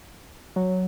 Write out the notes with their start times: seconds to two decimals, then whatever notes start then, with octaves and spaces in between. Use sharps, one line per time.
0.56 F#3